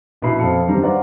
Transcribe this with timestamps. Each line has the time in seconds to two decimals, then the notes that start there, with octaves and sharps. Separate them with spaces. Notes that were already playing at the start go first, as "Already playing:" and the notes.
0.22 A#1 B2 E4 B5 C7
0.39 F2 C4 A4 F5 A5 C#7
0.67 G2 D3 D#3 G3 C4 A#5
0.83 B4 C5 D5 F5 F#5 A#5